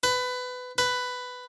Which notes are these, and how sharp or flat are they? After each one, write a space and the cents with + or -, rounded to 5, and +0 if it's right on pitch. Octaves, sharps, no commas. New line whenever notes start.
B4 +20
B4 +10